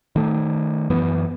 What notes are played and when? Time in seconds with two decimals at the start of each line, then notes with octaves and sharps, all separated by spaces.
0.16 D#3 A3
0.90 F#2 E3 B3